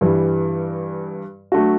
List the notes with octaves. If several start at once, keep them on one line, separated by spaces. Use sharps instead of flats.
G2 E3 G3
F#3 A3 D4 F#4